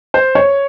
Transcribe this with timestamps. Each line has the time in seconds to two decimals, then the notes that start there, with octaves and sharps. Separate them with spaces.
0.14 C5
0.35 C#5